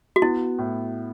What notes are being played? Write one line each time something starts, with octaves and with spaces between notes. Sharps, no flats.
F#4
B3 E4
A2